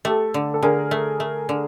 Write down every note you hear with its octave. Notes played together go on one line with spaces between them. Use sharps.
A3 G4 A4
D3
A4
D3 G#4 A#4
A3
A3
D3